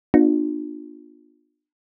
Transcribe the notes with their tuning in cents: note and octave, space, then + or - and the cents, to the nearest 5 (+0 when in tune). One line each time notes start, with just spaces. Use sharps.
B3 +0 D4 +45 F4 +30